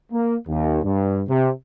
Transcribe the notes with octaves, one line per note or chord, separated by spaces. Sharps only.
A#3
D#2
G2
C3